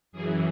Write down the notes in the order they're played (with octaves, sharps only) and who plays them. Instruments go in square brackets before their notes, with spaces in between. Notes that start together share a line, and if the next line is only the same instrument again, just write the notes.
[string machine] F#2 E3 G#4